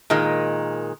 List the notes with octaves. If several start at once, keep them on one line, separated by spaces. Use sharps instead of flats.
A#2 D#3 G#3